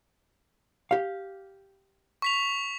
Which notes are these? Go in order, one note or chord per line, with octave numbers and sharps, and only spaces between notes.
G4 F5
C#6 B6 F7